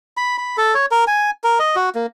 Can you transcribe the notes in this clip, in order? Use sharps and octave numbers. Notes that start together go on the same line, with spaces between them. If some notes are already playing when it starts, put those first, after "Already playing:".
B5
B5
A4
C#5
A#4
G#5
A#4
D#5
F#4
A#3